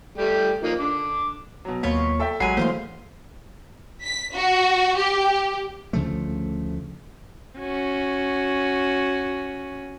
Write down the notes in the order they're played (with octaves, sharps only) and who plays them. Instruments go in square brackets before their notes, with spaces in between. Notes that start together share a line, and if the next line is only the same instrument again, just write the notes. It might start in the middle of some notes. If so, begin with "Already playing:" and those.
[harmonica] G3 A3 G4
F3 A#3 D#4
D3 D6
[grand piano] B2 F#3
[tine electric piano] D#2 A#3 [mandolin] F4 C#5 B5
[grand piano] A4 E5 G5
[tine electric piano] A1 F#5 C7 [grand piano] F#3 G#3 [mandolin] G#5 B5
[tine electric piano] E3 A3 A#3 [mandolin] C5 F5 C6
[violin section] B6
F#4
G4
[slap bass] D2 C#3 F3 A3
[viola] C#4 F#4